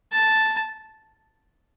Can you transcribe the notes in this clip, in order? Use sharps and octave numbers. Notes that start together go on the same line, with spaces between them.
A5